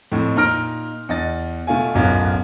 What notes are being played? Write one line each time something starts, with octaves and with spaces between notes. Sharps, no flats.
F2 A2
A#2 D#4 A#5 F6 A#6 D7
E2 D#5 A6
B2 A3 F4 G#5
D1 B1 F#2 B2 B3 F4